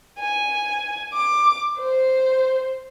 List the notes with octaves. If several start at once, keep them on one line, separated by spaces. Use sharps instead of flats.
G#5
D6
C5